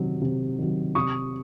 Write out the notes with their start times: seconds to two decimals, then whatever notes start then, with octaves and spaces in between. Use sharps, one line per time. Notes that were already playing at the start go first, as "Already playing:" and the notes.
Already playing: C3 D#3 F#3
0.21 C3
0.59 D#3 F#3
0.95 C3 C#6 D#6